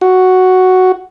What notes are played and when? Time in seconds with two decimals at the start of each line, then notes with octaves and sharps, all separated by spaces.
0.01 F#4